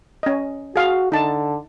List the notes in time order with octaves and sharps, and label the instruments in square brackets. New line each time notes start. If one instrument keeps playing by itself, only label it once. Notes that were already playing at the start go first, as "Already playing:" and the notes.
[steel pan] C#4 D#5
[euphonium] F#4 [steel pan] G#4 F5
[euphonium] D3 [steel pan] D#4 A5